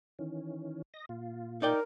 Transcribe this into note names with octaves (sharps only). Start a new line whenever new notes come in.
D#3 E3 C#4
D#5 A#6
A#2 F4
D#4 A#4 D5 G5